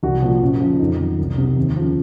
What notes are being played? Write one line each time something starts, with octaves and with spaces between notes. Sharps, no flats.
C2 F#4
A#2 F3
F#2
C#3 F3
F2 D#4
D#3 F#3
C2
C3 F#3
D#2
C#3 F3